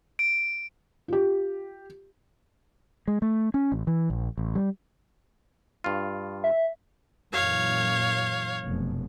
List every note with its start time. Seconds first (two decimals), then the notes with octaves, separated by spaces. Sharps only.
0.19 D7
1.08 F4 G4
3.08 G#3
3.22 A3
3.54 C#4
3.72 A1
3.87 E3
4.10 A#1
4.38 A1
4.55 G3
5.84 G2 F4
6.44 E5
7.33 F#2 A#2 E3 C#5 F5
8.66 F1 F#2 B2